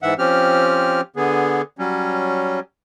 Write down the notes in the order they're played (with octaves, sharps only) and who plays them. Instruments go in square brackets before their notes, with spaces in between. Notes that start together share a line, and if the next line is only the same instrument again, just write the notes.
[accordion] G#2 E3 E5 F#5
F3 C4 C#4 G4 F6
D3 B3 G#4
F#3 G3 C#4